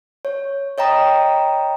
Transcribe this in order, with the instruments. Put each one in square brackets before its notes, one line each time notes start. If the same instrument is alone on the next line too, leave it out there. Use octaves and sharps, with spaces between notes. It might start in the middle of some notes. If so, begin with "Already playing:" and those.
[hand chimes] C#5
C#5 D#5 G5 A#5 B5 D#6